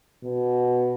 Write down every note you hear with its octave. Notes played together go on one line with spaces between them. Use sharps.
B2